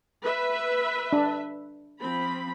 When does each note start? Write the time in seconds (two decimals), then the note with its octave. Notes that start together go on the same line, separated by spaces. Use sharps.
0.23 B4 E5
1.13 D4
2.02 F3 C4 B5